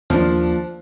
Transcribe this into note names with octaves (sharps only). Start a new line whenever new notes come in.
D#2 F3 A#3 D4